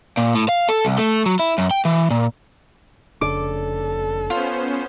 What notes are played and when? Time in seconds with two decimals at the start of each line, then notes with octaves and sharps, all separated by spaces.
0.17 A#2
0.35 A2
0.49 F5
0.69 A4
0.85 C2
0.98 A3
1.26 F#3
1.39 E4
1.58 F#2
1.71 G5
1.85 E3
2.11 A#2
3.21 F1 C#3 D4 A4 D6
4.30 B3 C#4 F4 C5